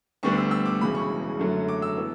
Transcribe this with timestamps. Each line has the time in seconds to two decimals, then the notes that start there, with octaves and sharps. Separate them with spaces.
0.23 D2 D3 G3 B3 D4 C#6
0.38 E6
0.51 E6
0.66 D6
0.81 E1 E2 C#3 E3 B5
0.95 C#6
1.39 F#2 D3 F#3 A3
1.68 D6
1.82 E6
1.97 E3 B3